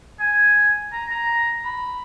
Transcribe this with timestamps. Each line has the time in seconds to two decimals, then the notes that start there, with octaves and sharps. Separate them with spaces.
0.20 G#5
0.92 A#5
1.11 A#5
1.65 B5